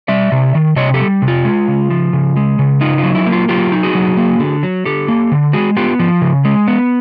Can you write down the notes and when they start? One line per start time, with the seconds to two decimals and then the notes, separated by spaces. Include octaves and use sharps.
0.08 G3 D5 E5
0.32 C3
0.55 D#3
0.76 C3 C#5 D#5
0.94 G4 A4
1.00 G3
1.22 C3
1.28 F4
1.45 G#3
1.68 C#3
1.90 F3
2.13 C#3
2.36 G#3
2.59 C#3
2.81 D#4 F4
2.98 F4
3.03 F#3
3.15 E4
3.27 A#3
3.32 F4
3.49 F#3 F4 G4
3.72 D#4
3.83 F#4 G#4
3.95 F#3
4.17 A#3
4.40 D3
4.63 F#3
4.85 D3 G4 A4
5.08 A#3
5.32 D3
5.53 G#3 F#4 G#4
5.77 B3 F4 G4
5.99 F3
6.21 C#3
6.45 G#3
6.68 B3